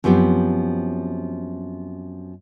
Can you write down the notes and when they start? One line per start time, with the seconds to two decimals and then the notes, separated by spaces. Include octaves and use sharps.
0.04 F#2 F3 B3 C4 G4